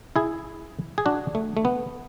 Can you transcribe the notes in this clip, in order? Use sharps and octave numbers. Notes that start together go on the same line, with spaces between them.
E4 G#4
G#4
D4 F#4
A3
A3
B3